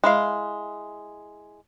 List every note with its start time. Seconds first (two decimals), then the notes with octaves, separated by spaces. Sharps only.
0.04 G#3 E4 F5